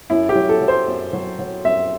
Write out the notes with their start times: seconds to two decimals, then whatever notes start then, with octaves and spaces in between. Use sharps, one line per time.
0.10 F#2 E4
0.29 G4
0.35 F#3
0.49 A4
0.61 F#3
0.68 C5
0.88 F#2
1.13 F#3
1.39 F#3
1.65 F#2 E5